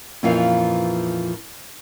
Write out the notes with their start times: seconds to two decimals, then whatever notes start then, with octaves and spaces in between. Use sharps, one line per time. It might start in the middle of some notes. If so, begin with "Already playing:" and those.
0.23 F2 A#2 E3 F3 C#4 F4